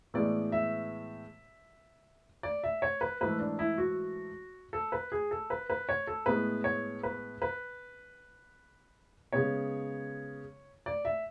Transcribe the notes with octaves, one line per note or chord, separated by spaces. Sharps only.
A2 E3 G#3 B3 D5
E5
D5
E5
C#5
B4
G#2 E3 A3 B4
D4
E4
F#4
A4
B4
G#4
A4
B4
B4
C#5
A4
A2 G#3 B3 B4
C#5
B4
B4
C#3 G#3 B3 C#5
D5
E5